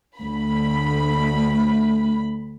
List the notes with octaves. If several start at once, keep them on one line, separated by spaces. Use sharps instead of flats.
D2 B5